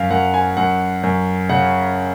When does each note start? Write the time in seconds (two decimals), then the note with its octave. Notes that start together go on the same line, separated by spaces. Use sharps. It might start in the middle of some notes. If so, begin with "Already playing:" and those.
Already playing: F#2 F5
0.10 F#2 F#5
0.34 G#5
0.57 F#2 F#5
1.03 F#2
1.49 C#3 F#5